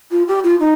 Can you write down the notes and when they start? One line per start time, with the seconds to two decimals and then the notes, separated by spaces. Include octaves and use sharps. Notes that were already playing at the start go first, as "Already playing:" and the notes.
0.11 F4
0.27 G4
0.43 F4
0.60 D#4